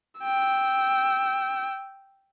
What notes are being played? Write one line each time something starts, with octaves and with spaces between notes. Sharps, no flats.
G5 E6